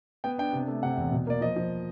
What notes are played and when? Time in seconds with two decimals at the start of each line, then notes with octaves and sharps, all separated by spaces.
0.24 B3 G5
0.38 D4 G5
0.53 C3
0.68 A3
0.83 C3 F#5
0.97 E2
1.11 B2
1.27 A#3 D5
1.41 F3 D#5
1.56 F3